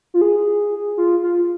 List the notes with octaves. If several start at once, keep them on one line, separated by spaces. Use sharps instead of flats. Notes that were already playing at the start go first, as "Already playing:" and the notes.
F4
G#4
F4
F4